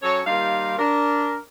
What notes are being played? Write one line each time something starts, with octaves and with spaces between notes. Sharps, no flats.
F#3 C#4 A4 C#5
D#2 G3 D#4 F4 G4 F5
D4 A#4